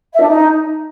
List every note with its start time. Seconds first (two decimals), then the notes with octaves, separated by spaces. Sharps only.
0.14 E5
0.21 D4
0.28 D#4